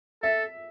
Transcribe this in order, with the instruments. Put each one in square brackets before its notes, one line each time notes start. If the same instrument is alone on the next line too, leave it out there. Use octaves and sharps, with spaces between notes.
[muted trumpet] A4 [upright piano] E5